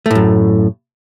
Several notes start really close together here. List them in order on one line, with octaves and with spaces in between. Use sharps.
A3 A2 F#2